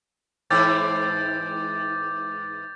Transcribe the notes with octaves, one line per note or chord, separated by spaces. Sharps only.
G#2 E3 C4 D6 G6 A6